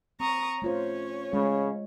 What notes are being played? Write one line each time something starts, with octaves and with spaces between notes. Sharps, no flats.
C4 A#5 C#6 D#6
A3 C#4 F4 C5 C#5
C#3 G#3